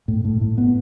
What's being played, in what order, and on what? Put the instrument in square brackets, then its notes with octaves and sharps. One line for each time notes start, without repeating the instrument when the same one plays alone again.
[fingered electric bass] A2
A2
A2
B3